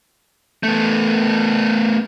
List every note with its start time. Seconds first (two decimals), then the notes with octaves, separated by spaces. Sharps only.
0.63 A3 B3